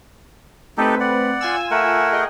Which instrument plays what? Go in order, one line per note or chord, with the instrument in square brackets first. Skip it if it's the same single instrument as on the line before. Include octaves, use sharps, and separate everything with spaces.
[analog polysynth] A3 C4 B4 [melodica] D#4 G4 A4
[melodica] D5 F#5
[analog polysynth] F4 G#5 E6
[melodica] A3 A#4 F#5
[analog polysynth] G#4 D#5 G5